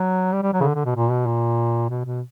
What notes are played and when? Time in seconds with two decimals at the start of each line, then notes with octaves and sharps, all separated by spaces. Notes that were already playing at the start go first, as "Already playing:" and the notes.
Already playing: F#3
0.33 G3
0.43 G3
0.53 F#3
0.60 C#3
0.63 D3
0.75 D3
0.85 B2
0.96 A#2
1.11 B2
1.27 A#2
1.90 B2
2.05 B2